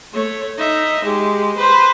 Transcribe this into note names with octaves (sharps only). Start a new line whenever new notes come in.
A3 C#5
D#4 E5
G#3 G4
B4 C5